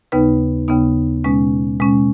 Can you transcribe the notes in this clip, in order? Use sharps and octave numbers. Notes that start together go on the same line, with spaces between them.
D#2 C#3 B3 D#4 B4
D#2 C#3 B3 D#4
B2 G#3 C#4
B2 G#3 C#4